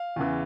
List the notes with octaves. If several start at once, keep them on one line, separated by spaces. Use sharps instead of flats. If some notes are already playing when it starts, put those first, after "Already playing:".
Already playing: F5
E2 C#3 E3